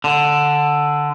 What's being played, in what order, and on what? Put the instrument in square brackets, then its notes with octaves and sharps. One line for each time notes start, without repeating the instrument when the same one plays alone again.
[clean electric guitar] D3